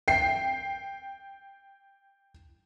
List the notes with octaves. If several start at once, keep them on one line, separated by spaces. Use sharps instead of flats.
G5 C7